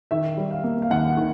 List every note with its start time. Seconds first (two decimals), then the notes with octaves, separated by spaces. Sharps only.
0.11 D#3 E5
0.37 G3
0.51 F5
0.64 A#3
0.82 F5
0.90 D#2 F#5
1.17 D#3